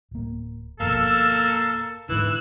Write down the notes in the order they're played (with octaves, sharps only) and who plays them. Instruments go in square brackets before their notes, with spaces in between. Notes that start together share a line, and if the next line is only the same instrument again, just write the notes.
[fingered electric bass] D1 A#3
[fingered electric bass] G1 F2 B2 [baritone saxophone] A#3 [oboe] A4 [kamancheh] E6
[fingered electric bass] G#2 D3 [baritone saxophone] E3 [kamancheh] E6 F#6